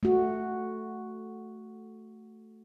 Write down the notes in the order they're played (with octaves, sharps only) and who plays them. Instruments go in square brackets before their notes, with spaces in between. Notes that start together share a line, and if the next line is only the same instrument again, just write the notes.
[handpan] A3 F#4